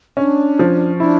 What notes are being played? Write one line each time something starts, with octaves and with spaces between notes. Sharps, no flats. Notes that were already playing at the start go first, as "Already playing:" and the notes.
C#4 D4
F3
D4 E4